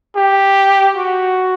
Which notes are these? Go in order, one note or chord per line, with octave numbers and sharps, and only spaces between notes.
G4
F#4